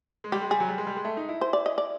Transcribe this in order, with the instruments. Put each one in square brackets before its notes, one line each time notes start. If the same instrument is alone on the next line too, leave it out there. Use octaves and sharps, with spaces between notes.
[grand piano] G#3
[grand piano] G3 [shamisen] G4
[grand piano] G#3
[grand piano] G3 [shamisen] G#4
[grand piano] F#3
G3
G#3
G3
G#3
A3
D#4
E4
[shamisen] C5
D5
D#5
D5